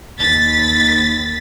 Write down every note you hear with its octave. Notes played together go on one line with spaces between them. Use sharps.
D#2 A6 B6